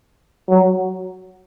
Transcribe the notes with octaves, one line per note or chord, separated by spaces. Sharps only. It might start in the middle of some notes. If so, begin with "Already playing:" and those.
F#3